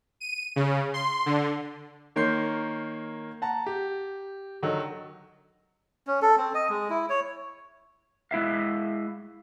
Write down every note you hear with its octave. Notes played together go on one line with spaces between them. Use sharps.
D#7
C#3
C6
D3
D#3 A#3 C#5 C6 G6 C7
F#5 A5 A#5
G4
D3 D#3 F#3 D#4
C#4
A4
C4
D#5
G#3
E4
C#5
G#3 E4 E5 F5